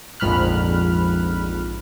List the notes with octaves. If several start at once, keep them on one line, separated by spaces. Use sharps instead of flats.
A#1 F2 G#2 B5 F6 F#6